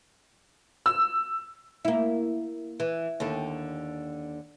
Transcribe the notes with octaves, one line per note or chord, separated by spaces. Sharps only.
E6
A#3 E4
E3
D#2 D3